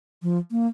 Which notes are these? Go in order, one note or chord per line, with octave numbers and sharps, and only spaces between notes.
F3
A#3